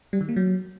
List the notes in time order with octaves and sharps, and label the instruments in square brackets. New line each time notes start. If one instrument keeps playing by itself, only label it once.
[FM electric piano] G3
D#3
A#3
F#3